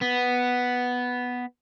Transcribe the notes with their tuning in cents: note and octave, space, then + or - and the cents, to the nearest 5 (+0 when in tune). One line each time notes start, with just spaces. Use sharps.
B3 +0